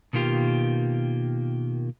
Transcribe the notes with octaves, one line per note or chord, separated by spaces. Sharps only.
B2 D#3 A#3 F4 G4